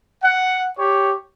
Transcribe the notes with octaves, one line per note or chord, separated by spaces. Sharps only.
F#5
G4 C#5